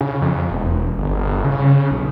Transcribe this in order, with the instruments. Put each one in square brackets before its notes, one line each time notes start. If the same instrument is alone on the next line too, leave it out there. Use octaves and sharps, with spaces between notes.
[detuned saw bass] C#3
F2
E1
G1
C#3
B1